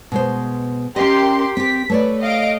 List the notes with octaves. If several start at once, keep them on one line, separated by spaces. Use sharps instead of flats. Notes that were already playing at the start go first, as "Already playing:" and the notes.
B2 G#3 C5
C#4 G4 A#4 D#5 C6
C4 G4 B6
A3 B4 C#5 D5
D#5 F5 D7